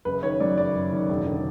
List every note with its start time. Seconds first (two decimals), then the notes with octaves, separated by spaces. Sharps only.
0.05 F#1 B4
0.23 D#3 C#5
0.40 F#2 D5
0.57 F#1 D5
0.75 F#1
0.92 D#3
1.09 E1
1.27 D3